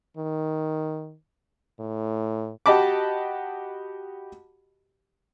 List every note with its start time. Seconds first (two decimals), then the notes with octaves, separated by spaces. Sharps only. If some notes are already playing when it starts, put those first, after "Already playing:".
0.17 D#3
1.80 A2
2.66 F#4 G4 D#5 A5 B5 D6